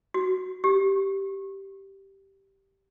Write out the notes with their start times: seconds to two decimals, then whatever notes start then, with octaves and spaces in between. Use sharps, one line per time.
0.14 F#4
0.64 G4